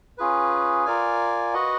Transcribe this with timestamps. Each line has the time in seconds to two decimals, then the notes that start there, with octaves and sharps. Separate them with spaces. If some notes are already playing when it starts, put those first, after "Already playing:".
0.18 C#4 F4 G#4 B4
0.85 F4 A#4 D5 F5 G#5
1.54 F#4 B4 D#5 F#5